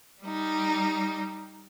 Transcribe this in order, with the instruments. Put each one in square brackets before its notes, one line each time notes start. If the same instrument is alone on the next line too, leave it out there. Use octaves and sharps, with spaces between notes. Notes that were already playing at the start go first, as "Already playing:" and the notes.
[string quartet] G3 D#4